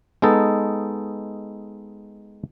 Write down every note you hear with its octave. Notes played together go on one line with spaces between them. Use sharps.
G#3 B3 D#4 A4